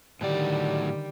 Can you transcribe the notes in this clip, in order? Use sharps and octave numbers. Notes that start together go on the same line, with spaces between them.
A2 D3 D#3 F#3 G3 D5